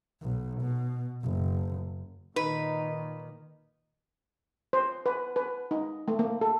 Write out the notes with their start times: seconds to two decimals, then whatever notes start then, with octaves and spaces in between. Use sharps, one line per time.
0.21 B1
0.60 B2
1.23 F#1
2.36 A#2 D#3 D#4 B4
4.73 C5
5.06 B4
5.36 B4
5.71 D#4
6.08 A3
6.19 A#3
6.41 A4